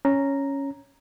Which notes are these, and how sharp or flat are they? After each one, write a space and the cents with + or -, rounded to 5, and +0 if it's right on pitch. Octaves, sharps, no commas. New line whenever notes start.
C#4 +0 A#5 +0